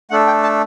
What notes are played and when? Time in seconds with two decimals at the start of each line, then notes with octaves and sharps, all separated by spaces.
0.11 A3 D4 A4 F#5
0.27 G5
0.43 A5